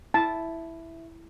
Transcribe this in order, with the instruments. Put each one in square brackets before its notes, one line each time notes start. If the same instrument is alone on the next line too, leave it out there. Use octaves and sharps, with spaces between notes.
[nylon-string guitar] E4 [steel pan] A5